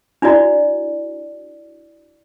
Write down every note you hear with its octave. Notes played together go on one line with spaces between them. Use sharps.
D4 E4 F#4 D5